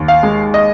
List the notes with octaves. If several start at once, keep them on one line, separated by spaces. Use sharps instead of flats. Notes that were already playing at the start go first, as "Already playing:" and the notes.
Already playing: D#2
F5
G#3
D#5